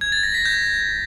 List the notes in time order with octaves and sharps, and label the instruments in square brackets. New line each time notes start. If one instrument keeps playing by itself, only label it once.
[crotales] G#6
A6
A#6
B6
G6